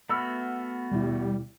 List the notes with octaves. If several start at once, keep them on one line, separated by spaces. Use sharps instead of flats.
A3 B3 F#4 B5 E6 F6
D#2 B2 G3 E4